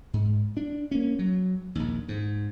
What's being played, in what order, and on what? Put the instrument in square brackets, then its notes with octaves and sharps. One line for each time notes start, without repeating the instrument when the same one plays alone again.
[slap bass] G#2
D4
A#3 C#4
F#3
A#1 D#2
G#2